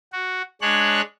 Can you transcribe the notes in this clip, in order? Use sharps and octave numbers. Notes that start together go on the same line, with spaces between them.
F#4
G#3 D4 C#5 F#6